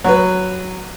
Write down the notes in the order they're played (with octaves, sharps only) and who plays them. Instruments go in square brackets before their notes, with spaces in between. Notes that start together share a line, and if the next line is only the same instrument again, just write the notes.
[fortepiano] F#3 B4